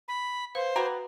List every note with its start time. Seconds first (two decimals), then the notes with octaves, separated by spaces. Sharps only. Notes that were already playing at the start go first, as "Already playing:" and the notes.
0.08 B5
0.55 B4 C5 F5
0.76 B3 F#4 B4 G5 A#5